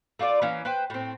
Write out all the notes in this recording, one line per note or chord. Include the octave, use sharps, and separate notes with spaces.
A3 F4 F#4 D5
E3 A#3 C#4
B4 C5 G5
A2 C4